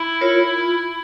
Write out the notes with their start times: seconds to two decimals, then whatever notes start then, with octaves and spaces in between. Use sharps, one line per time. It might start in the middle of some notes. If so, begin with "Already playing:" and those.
Already playing: E4
0.21 F4 A#4 C#5
0.58 F4